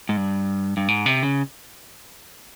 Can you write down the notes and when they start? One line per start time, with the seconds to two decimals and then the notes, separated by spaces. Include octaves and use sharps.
0.09 G#2
0.17 G2
0.77 G2
0.88 G#2
1.06 C3
1.23 C#3